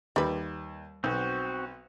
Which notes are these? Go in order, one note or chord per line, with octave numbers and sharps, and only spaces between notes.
D#2 G3 B4
B1 C4 F#4